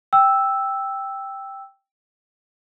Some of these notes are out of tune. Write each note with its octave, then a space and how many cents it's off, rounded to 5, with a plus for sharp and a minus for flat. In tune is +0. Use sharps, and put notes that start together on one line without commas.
G5 +0 E6 +0